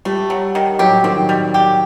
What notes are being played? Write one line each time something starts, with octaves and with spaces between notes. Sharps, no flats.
G3 A3
F#3
D#3
F#3 G4
D#3 C4
G3
G4